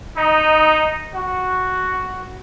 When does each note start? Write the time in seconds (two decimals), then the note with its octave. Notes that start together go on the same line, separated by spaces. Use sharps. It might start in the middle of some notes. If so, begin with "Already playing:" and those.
0.16 D#4
1.15 F#4